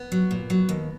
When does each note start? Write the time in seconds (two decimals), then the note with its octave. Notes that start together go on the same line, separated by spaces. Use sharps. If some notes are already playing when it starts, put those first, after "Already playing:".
Already playing: B3
0.12 F#3
0.31 A#2
0.50 F#3
0.69 D#2